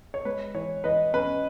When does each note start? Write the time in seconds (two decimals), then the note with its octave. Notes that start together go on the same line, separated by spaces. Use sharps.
0.14 C#5
0.25 G#3 B4
0.54 E3 C#5
0.84 E3 B4 D#5
1.13 C#4 B4